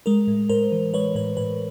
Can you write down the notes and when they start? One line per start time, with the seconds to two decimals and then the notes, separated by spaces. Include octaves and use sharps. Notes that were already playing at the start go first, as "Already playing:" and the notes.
0.06 G#3 A#4
0.28 A2
0.49 A2 A#4 C5
0.72 E3
0.94 G#3 B4 C#5
1.15 A2 B4
1.37 A2 B4